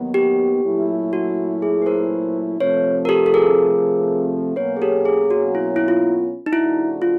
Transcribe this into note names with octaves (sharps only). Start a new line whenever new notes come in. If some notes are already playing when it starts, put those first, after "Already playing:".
Already playing: D#2 D#3 F#3 B3
G4
A#2 F#3 A3 C#4 E4
F#4
G#4
B4
A#4 C5
C3 F3 A3 B4 C#5
A#4
G4 A4
A4
G#4 A#4
B2 F#3 A#3 C#4 B4 C#5
G#4
G4 A4
G#4
F#4
E4
E4
F4
D#4
C#3 F3 A3 D4 E4 F#4
F4